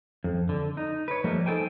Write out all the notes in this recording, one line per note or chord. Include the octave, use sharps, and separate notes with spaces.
F2
D3
D#4
B4 C#5
F3 G3 A3 A#3 D4 D#5
D#4 A4 C5 G5 G#5